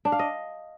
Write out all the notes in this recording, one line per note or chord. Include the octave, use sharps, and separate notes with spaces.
D4
F5
D#5